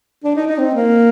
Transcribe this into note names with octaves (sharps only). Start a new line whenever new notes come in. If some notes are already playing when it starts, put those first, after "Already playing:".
D4
D#4
D#4
C4
A#3